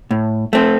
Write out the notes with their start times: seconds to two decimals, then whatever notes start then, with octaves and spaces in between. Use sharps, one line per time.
0.11 A2
0.53 A3 C4